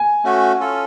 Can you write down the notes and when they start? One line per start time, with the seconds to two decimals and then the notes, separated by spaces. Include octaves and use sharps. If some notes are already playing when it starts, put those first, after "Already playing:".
Already playing: G#5
0.24 A3 C#4 F#4
0.59 C#4 F4 A4